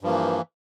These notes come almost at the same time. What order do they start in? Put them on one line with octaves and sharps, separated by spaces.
G2 F3 A#3 E3